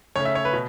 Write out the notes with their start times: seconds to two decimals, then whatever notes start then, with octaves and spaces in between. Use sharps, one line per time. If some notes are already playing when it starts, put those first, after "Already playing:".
0.16 C#3 A3 C#4 C#5
0.25 E5
0.35 C#5
0.45 B4
0.53 B2